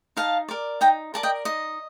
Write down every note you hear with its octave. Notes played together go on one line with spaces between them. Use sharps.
D#4 F5 A5
A#4 D5
D#4 G5 A#5
A#4 D5 A5
D#5 G5
D#4 D#5